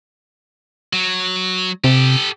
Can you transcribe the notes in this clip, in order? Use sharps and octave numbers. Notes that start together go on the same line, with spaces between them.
F#3
C3 G4 A4